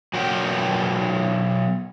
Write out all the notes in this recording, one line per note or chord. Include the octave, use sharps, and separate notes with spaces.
B2 F#3 F#4 A#4 G5